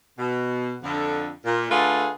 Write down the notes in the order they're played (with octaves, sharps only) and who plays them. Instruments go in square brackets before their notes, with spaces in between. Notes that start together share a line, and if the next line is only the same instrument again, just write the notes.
[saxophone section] B2
F2 D3
A#2
D3 A3 F4 G#4 B4